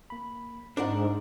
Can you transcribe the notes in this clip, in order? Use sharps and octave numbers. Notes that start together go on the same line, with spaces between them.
A#3 B5
G#2 D4 D#4 A#4 C5 F#5